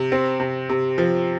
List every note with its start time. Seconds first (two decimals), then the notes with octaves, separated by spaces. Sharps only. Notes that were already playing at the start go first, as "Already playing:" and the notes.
Already playing: C3
0.12 C4
0.40 C3
0.69 C3
0.98 F3